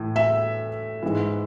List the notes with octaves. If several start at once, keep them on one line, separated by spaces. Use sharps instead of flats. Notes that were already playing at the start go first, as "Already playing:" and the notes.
Already playing: A2 E3
E5
G#2 E3